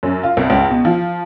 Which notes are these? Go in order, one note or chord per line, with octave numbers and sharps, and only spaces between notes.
F#2
F4
C2
C#2
B2
F3